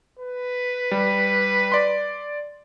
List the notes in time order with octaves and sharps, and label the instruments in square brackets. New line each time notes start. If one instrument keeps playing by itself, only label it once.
[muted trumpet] B4
[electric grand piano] G3
D5 C6